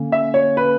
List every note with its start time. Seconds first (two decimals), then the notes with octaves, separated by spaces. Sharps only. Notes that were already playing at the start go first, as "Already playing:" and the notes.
Already playing: D3 A#3 C#4
0.12 E5
0.34 C#5
0.57 B4